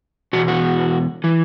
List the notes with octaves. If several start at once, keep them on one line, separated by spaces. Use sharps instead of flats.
E2 B2 F#4
F#4
E3